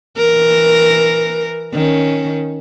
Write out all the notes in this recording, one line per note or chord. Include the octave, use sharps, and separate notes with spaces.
E3 A#4
D#3 C#4